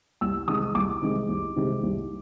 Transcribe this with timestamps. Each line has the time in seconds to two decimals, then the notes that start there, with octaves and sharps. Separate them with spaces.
0.21 C2 E6
0.48 C3 D#3 G#3 D#6
0.75 C2 D6
1.02 C3 D#3 G#3
1.29 C2
1.56 C3 D#3 G#3
1.83 C2